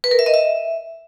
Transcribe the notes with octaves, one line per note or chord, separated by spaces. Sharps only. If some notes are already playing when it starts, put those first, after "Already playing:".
B4
A#4
E5
D#5
E5